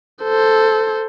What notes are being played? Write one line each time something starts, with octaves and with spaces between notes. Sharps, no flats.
A4 C5